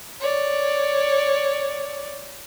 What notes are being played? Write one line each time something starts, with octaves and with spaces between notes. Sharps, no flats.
C#5 D5